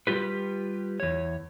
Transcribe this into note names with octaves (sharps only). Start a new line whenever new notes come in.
G3 F4 G4 B4
E2 C#5